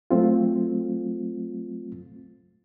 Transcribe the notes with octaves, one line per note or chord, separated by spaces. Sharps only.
F#3 A3 C4 F4